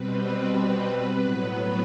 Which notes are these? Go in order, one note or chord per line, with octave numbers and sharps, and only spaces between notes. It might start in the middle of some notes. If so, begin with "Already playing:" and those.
Already playing: B2 G3 C4 B4
A2 F#3 B3